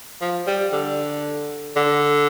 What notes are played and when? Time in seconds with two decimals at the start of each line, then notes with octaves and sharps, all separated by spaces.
0.21 F3
0.47 G3
0.72 D3
1.76 D3